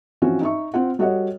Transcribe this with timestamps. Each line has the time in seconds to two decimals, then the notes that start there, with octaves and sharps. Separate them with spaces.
0.22 E3 F3 C4 C#4 F#4
0.41 D#4 E5 C#6
0.74 C4 F4 F#5
0.99 G3 F#4 A4 C#5 D#5 F#5